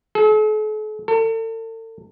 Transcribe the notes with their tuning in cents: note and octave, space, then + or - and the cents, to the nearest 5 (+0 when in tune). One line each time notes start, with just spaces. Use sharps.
A4 -45
A4 +40